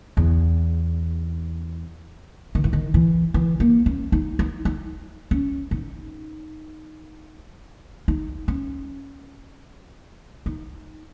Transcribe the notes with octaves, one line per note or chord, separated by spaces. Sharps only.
E2
D#3
E3
D#3
E3
E3
A#3
C#4
D#4
D#4
D#4
C#4
D#4
D#4
C#4
D#4